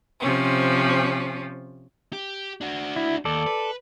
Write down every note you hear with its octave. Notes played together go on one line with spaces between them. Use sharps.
C3 F3 C#4
G4
D4 F#4
E4
D#2 A4 D5
B4